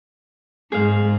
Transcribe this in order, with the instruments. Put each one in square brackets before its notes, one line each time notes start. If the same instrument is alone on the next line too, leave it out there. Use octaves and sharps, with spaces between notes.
[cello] G#2 [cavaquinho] G#4 C5 F5